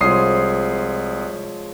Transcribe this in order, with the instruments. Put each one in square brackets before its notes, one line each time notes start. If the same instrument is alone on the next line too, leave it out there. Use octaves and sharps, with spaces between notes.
[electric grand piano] C2 D#6 C7 [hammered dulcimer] F3 G#3 C#5